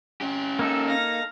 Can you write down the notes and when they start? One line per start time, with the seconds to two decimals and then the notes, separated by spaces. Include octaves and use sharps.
0.21 C#4 G4
0.59 A#3 D#4 A4 E6
0.88 F5 A#6